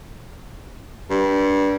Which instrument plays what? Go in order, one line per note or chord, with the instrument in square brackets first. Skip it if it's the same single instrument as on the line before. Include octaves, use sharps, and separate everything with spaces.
[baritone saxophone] G2